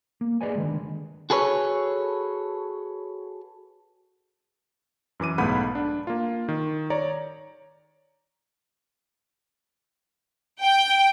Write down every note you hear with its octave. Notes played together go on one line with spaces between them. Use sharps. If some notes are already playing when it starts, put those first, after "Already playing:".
A#3
G4 G#4 B4 D5 D#5 G#5
D3 D#3 G#3
F#4 G#4 A4 B4 C#5
F#2 E3 D6 D#7
B1 G#2 A3 B3 F#5 B5
D4
A#3 F4
D#3
C#5 D5 A#5
G5